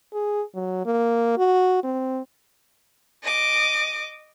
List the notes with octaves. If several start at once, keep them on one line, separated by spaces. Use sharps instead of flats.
G#4
F#3
A#3
F#4
C4
D#5 D6